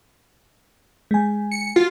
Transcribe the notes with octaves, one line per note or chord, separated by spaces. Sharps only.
G#3 G#5
C#7
F4 F#4